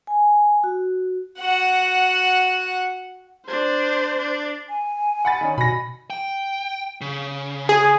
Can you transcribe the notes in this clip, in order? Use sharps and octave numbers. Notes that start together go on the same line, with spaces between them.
G#5
F#4
F#4 F#5
D4 C5
D4
G#5
F#5 B5 A6
D#3 C#4
B2 B5 A#6
G5
C#3
G#4